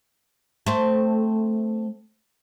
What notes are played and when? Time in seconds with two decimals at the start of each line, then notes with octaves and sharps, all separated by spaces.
0.66 A3 C4